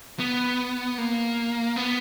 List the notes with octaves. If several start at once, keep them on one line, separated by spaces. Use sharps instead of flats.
B3
A#3
B3